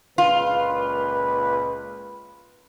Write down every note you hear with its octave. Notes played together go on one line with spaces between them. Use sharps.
C#2 A#2 F4 B4